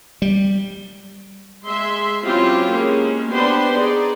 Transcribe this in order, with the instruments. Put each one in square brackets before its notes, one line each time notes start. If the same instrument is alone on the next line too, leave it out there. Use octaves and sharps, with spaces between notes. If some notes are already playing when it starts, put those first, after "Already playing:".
[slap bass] G3
[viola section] G#3 E5 C6
F#3 C4 C#4 E4 F4 G4
G#3 A#3 C#4
B3 D4 G4 B4 C5 C6
D#4 G#4 D5